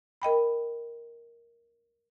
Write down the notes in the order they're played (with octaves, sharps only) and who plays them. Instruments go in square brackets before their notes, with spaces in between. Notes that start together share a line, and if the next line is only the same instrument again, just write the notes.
[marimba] A#4 D#5 G5 B5